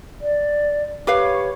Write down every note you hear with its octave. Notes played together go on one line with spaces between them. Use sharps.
D5
G4 B4 C#5 F5